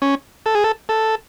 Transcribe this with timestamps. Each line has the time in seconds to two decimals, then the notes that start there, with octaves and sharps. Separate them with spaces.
0.02 C#4
0.46 A4
0.55 G#4
0.64 A4
0.89 A4